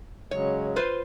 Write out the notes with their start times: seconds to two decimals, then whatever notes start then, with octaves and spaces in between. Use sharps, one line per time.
0.31 C#3 F#3 G#3 C#5
0.76 F4 B4 C5